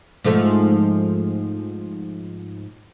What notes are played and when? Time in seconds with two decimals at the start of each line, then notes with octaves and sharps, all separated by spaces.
0.25 G#2 F3 A3